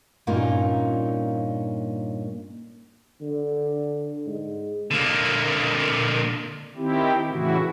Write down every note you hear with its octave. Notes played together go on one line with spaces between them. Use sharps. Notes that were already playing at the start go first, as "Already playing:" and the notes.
G2 A#2 A#3 C#4 D#4 F4
D3
G#2
D3 A#3
D#3 C4 E4 G4
A2 C#3 E3 E4 F#4